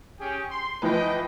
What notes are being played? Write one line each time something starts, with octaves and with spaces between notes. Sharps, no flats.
C#4 G4 G#4
C6
E3 F3 B4 D#5 G5